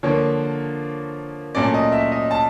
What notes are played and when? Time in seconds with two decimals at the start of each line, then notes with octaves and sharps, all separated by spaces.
0.03 D3 F3 A#3 C#5
1.55 A#2 F#3 A3 C#4 D5
1.74 D#5
1.92 E5
2.12 D#5
2.31 A5